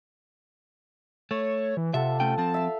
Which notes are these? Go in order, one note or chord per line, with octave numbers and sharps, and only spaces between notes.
A3 C#5
E3
C3 F4 A4 E5 F#5
A3 C#4 G5
F3 C4 A5
E5 F5